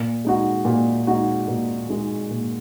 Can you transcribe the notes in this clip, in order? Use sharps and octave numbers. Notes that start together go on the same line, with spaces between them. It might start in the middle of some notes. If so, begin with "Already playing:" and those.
Already playing: A#2
G#3 D#4 F#4
A#2
G#3 D#4 F#4
A#2
G#3 D#4 F#4
A#2